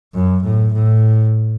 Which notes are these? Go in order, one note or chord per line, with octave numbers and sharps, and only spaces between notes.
F#2
A2
A2